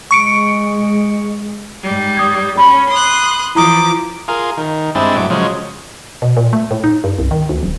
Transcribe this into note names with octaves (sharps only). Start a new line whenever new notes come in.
G#3 C#6 C#7 D7
G#2 G3
D#6 G#6
C#4 B5
C6 D#6 F#6
E3 F3 E4 A#5 D6 D#6
F4 G#4 A#4
D#3
G2 G#3 C4 D4 E4 A5
A2 F#3 D6
C#3 F3 F#3 G#3
B2
A#2
A3
A2
D#4
G2
C2
D#3
D2
D1